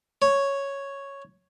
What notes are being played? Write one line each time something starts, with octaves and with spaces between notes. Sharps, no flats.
C#5